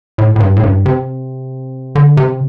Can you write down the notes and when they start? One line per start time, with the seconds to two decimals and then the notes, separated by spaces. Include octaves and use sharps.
0.18 A2
0.36 A2
0.40 G2
0.57 A2
0.64 G2
0.86 C3
1.95 D3
2.17 C3